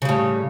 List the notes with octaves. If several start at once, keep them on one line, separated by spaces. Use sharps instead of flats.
A2 C#3 G3